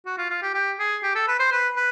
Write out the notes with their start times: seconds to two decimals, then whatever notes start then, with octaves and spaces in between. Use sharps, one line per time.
0.06 F#4
0.18 F4
0.30 F4
0.42 G4
0.54 G4
0.79 G#4
1.03 G4
1.15 A4
1.28 B4
1.40 C5
1.52 B4
1.76 B4